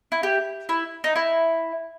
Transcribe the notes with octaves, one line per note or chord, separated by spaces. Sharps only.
E4
G4
E4
D#4
E4